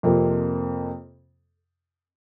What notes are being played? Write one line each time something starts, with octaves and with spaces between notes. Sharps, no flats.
F2 C3 F3 A#3